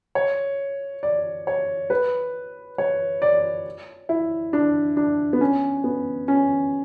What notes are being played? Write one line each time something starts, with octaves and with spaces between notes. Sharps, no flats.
C#5
D5
C#5
B4
C#5
D5
E4
D4
D4
B3
C#4
B3
C#4